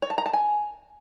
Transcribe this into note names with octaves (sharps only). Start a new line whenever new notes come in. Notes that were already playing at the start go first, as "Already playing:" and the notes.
C#5
A5
A#5
A5
G#5